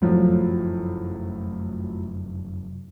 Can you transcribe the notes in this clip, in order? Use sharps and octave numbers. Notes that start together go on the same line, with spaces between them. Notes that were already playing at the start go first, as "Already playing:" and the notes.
F1 F#2 A2 F3 F#3